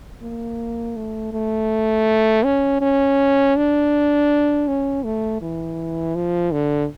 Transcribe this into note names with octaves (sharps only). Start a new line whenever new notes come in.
A#3
A3
A3
C#4
C#4
D4
C#4
A3
E3
F3
D3